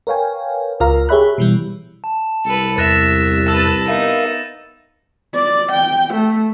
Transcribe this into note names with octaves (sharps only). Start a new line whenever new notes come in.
A#4 B4 C#5 F5 G5 G#5
C#2 F4 A#4 F5 A#5
G4 G#4 C#5 E5 B5 F#6
B2 E3 G3
A5
C2 A4 B4
E2 E5 F#6 A6 A#6 E7
B4 A5 E6 A6 E7
B3 D#4 A#4 E5 F5
D5
G5
A3